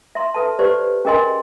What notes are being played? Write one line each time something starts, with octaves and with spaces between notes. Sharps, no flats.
E5 C6
A4 B4 E5 A5
G4 B4 C5 D5
C#4 G#4 A#4 D#5 G#5 C6